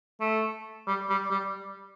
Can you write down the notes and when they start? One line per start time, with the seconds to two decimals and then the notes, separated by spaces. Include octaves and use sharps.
0.20 A3
0.87 G3
1.10 G3
1.31 G3